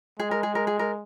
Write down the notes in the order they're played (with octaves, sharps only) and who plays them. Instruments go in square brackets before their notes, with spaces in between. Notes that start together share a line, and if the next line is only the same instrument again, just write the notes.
[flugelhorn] G#3 [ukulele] G#4
[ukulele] A#4
G#4
A#4
G#4
A#4